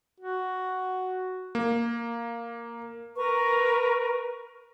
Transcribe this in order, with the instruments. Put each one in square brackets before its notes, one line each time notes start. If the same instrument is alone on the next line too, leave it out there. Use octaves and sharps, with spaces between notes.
[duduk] F#4
[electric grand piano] A#3
[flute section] A#4 B4 A#5 C#6